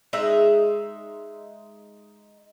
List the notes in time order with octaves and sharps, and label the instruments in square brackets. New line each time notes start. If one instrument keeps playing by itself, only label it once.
[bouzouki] G#3 D#4 E5